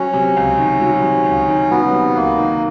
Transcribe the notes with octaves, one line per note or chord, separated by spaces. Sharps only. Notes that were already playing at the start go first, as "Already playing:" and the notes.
Already playing: F#3 C#4
C3
C#2
D#3
F#3
C3
C#2
D#3
F#3 B3
C3
C#2 A#3
D#3